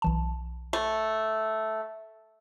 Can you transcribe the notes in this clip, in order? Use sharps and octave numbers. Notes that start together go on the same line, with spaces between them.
B1 E3 A5
A3